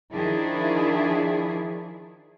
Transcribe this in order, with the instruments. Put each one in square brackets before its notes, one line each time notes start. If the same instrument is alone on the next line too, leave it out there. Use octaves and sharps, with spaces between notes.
[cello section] D#3 F3 D4 E4 G#4